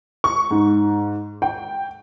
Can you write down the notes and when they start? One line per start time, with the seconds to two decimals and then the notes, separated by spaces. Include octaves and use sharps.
0.24 C#6
0.50 G#2
1.42 G5